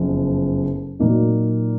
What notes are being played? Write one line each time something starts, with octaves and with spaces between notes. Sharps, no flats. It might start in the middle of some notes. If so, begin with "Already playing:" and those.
Already playing: F#1 F2 F3 B3
A#2 F#3 A#3 D#4